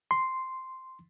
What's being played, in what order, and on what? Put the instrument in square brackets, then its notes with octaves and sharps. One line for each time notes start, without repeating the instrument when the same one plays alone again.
[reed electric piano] C6